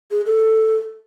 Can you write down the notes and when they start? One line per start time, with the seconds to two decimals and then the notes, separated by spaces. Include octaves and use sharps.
0.11 G#4
0.26 A4